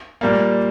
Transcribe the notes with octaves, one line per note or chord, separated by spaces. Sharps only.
A#2 G3 A#3